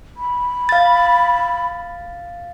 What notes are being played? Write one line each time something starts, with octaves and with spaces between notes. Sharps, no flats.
B5
F5 A6